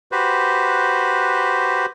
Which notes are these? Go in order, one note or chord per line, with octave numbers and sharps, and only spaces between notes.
F#4 G4 B4 C5